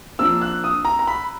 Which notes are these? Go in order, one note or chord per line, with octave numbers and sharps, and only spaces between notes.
F3 A#3 D4 E6
F#6
D#6
A#5
A#5
B5